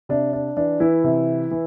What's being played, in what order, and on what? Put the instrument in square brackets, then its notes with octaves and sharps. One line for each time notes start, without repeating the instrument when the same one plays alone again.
[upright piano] C3 D4
D4
E3 D4
E3 E4
C3
E3